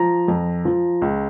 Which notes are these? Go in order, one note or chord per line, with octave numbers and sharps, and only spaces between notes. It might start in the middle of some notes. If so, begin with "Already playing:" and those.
Already playing: F3 A#5
F2
F3
C#2